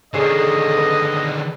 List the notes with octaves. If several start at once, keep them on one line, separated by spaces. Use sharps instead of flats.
D3 D#3 G#4 A4 C#5 D#5 C7
B4